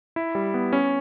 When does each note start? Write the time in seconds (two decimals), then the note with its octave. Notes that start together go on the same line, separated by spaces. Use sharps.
0.16 E4
0.35 G3
0.54 B3
0.73 C#4